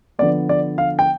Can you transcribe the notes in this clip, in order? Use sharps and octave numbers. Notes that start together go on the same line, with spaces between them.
D3 F3 B3 D5
D5
F5
G5